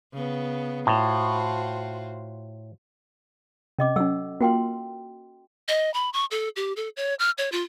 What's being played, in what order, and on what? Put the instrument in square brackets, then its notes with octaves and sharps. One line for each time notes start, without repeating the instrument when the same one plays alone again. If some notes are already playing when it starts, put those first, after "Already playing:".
[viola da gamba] C#3 B3
[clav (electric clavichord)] A2 [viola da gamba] F4 F#4 C5
[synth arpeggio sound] C3 [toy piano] C#4 D#5 D6
[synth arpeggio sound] F#3 C#4 [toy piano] A4 F#5 E6
[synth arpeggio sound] A#3 F4 [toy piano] F#4 G5 C6
[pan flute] D#5
B5
C#6
A4
G4
A4
C#5
F6
C#5
F4